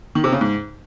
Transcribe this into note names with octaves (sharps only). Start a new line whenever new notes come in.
D#3
C3
C#3
G#2